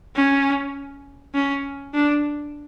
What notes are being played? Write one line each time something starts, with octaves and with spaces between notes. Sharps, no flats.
C#4
C#4
D4